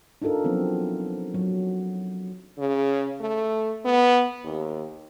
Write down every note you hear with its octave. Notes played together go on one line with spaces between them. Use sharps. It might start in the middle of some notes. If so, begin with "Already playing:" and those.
D4 D#4 F4 A4 A#4
F3 F#3 B3 C4
F#3
C#3
A3
B3
D#2